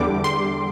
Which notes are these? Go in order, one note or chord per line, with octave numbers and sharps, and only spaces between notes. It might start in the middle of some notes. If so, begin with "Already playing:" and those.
Already playing: E2 D3 G3 D6
C6